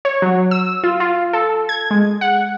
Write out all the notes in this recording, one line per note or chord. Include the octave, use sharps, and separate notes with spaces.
C#5
F#3
E6
F4
F4
A4
G#6
G#3
F#5